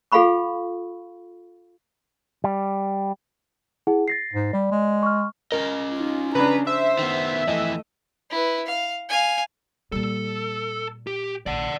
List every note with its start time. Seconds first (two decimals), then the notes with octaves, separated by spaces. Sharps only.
0.12 F4 A4 F5 F#5 B5 C#6
2.44 G3
3.87 E4 G#4 F#5
4.08 A6 A#6 C7
4.33 G#2
4.53 G3 D5
4.72 G#3
5.03 C#6 F6
5.52 C#4 A#4 D#5
5.95 D#4 F4
6.35 C#3 D4 B4 A#5
6.67 C5 E5
6.99 D#3 B3
7.47 F2 E3 A3 D#5
8.30 E4 B4
8.66 F5
9.09 F5 G#5
9.92 A#2 G3 A4
11.07 G4
11.46 D1 A#1 D5 F#5